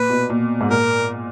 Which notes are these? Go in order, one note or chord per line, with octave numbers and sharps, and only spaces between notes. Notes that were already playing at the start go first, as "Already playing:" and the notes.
Already playing: A#2 B4
B2
A#2
G#2
A#2 A#4